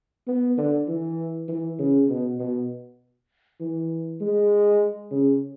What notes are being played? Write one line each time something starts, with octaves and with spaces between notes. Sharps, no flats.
B3
D3
E3
E3
C#3
B2
B2
E3
G#3
C#3